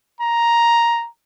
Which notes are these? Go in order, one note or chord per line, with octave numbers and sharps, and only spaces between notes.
A#5